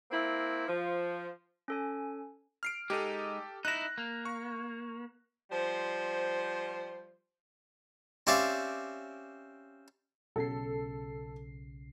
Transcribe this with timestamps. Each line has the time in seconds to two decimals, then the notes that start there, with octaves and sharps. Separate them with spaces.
0.12 A#3 C4 E4
0.68 F3
1.68 C#4 A4 G#5
2.63 F6 C7 D7
2.90 G#3 D#4 G4 A4
3.65 D#4 E4 F#6 A#6
3.98 A#3
4.25 C#6
5.50 F3 G3 C5
8.27 C4 C#4 G4 D5 E5 F5
10.36 B1 C#3 A4 C7